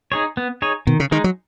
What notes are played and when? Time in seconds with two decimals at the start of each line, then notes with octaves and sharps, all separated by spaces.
0.12 D#4 G#4 C#5
0.37 B3
0.62 D#4 G#4 C#5
0.87 B2 D#3
1.00 C#3
1.11 D#3 G#3 D#4
1.24 F#3